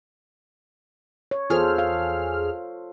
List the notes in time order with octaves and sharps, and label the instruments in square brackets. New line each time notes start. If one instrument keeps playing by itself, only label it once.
[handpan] C#5
[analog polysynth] E2 G#4 F6 [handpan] F4 A4 C5
[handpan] F5